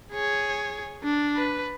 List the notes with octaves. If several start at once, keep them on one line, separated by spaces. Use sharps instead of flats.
G#4 C#5
D4
B4